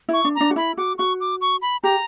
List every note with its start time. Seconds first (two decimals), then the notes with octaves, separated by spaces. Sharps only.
0.09 E4 C#6
0.24 D4
0.35 A#5
0.41 D4
0.50 F#4
0.56 E4 B5
0.78 F#4 D6
0.98 F#4 C#6
1.20 D6
1.41 C#6
1.62 B5
1.83 G4 A#5